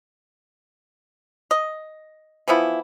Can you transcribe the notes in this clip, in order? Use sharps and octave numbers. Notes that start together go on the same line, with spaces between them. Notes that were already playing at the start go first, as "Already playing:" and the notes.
D#5
E3 F3 B3 E4